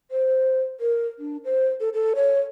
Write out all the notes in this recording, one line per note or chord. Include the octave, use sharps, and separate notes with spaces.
C5
A#4
D4
C5
A4
A4
C#5